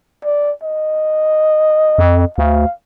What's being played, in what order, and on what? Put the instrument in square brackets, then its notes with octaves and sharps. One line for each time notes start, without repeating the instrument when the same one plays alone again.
[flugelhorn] D5
D#5
[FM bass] F2
[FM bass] D2 [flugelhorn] F5